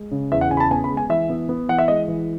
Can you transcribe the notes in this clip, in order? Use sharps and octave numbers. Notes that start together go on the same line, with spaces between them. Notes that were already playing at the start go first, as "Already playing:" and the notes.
Already playing: G#3
C#3
E2 E5
F#5
C#3 G#5
B5
A5
B3 G#5
B5
G#3
G#5
E3 E5
B3
B3
E3 F#5
E5
G#3 D#5
E3